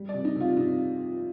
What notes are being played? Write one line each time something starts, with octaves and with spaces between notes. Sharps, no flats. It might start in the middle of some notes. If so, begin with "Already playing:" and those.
Already playing: G3
D5
C3
D#4
C3 F4
C3 D#4